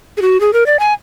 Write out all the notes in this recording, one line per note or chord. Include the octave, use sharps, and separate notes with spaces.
G#4
F#4
G#4
A#4
D5
G#5